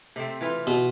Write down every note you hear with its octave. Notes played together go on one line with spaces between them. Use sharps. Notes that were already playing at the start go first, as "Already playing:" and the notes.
C3 A3 C4
E3 F4 B4
B2